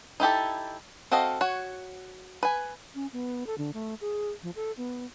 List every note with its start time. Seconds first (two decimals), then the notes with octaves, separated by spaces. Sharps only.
0.20 D#4 E4 G4 A4
1.11 C4 F#4 A4 D#5 F5
1.41 F#4 C#5
2.43 B4 G#5
2.95 C#4
3.13 B3
3.47 A4
3.58 D3
3.74 A3
4.01 G#4
4.43 F3
4.56 A4
4.77 B3